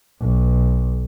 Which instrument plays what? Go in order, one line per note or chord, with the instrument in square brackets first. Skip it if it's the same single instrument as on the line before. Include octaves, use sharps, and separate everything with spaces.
[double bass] B1